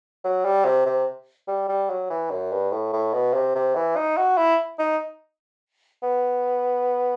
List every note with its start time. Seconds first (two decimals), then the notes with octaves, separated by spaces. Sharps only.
0.24 F#3
0.45 G3
0.65 C3
0.86 C3
1.48 G3
1.69 G3
1.90 F#3
2.10 E3
2.31 F#2
2.52 G2
2.72 A2
2.93 A2
3.13 B2
3.34 C3
3.55 C3
3.76 E3
3.96 D#4
4.17 F#4
4.37 E4
4.79 D#4
6.03 B3